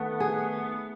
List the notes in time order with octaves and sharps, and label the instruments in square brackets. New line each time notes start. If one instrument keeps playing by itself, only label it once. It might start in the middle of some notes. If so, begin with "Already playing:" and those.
Already playing: [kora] D#3 A3 [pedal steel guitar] B3
[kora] G#4